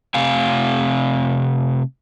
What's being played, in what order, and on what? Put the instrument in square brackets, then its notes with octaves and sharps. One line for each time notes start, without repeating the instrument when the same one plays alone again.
[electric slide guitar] C3 A3 C4 F5 G#5